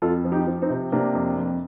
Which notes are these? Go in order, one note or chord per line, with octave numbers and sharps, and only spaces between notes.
F2 F4 A4
F3
D#4 G4
F3
C4 D#4
C3
C3 A#3 D4
F2
F2